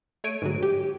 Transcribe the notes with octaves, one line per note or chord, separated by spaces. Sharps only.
A3 C#5 D7 D#7
G#2 D3 F#3
G4